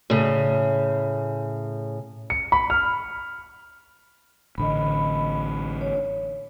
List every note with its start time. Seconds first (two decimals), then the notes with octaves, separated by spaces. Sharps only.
0.10 A2 C#3
2.30 C#7
2.52 B5
2.70 F6
4.58 A1 D3 D#5 B5
5.81 C#5